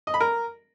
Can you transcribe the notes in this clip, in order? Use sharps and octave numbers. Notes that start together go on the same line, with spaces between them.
D#5
B5
A#4